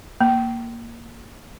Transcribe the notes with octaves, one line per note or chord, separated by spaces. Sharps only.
A#3